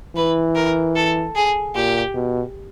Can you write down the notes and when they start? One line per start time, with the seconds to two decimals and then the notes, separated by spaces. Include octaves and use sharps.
0.16 E3 B4
0.56 A#4
0.96 A4
1.36 G#4
1.75 A#2 G4
2.15 B2